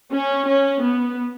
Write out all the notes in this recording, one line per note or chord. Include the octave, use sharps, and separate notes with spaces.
C#4
C#4
B3